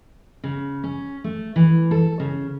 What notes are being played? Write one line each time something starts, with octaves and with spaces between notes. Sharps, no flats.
C#3
C#4
A3
E3
A4
C#3